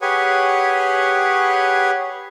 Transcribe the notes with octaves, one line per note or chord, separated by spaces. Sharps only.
G4 G#4 B4 C#5 F#5 G#5